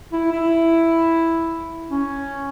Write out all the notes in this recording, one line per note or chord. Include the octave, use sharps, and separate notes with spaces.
E4
E4
C#4